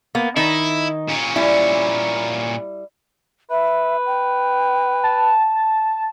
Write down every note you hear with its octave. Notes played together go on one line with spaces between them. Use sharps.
A#3 B3
D#3 D#4 E4
A#2 C#4
G3 E4
B4 E5
G5
A5